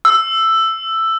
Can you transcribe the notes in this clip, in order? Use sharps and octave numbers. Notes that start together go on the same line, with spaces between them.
E6